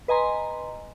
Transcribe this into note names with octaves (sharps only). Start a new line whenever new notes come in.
B4 D#5 G#5 A#5 C6